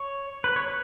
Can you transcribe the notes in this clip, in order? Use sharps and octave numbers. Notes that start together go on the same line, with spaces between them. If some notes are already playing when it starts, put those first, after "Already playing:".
Already playing: C#5
B4
C#5
B4